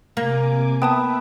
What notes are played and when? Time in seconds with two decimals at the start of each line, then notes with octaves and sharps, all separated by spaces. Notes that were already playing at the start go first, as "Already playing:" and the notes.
0.17 C3 A#3 G#5 D6
0.82 B3 E5 G5 A5 D#6